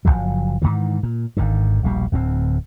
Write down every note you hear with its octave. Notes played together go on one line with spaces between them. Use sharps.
F#1 F#2 F3 F#3
G#2 B2 D#3 E3
A#2
G#1 G#2 D3 D#3
D#1 A#1 B2 G3
D1 D2 B3 C4